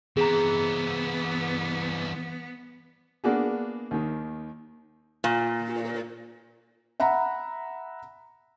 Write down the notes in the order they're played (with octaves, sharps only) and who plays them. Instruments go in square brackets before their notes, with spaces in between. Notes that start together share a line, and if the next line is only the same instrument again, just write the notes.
[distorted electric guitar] E3 C4 [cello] B3 [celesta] G#4 A#5
[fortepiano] A#3 B3 D4 F#4 G#4
D#2 D#3
[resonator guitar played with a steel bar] A#2
[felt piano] E5 F#5 A#5 B5